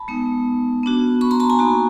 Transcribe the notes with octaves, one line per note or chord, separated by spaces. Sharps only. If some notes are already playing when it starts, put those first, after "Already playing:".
Already playing: A5 B5
G#3 B3 D#4
B3 D4 F#4
B5 C#6
A#5 C6
A5 B5
G#5 A#5
A#3 D#4 F#4